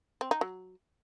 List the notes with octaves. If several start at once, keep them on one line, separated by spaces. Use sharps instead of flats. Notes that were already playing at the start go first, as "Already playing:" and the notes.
C4
D#4
F#3